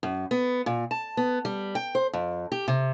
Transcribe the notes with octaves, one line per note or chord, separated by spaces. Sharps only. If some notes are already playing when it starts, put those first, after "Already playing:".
F#2
B3
A#2
A5
B3
G3
G5
C5
F2
G4
C3